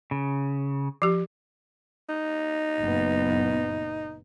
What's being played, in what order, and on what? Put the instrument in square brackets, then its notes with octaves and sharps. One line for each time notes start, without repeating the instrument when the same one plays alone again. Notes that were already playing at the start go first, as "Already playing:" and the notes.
[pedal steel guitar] C#3
[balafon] F3 G4
[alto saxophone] D#4
[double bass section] F#1 A#2 B3